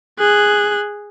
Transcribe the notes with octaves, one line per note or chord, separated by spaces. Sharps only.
G#4 F#6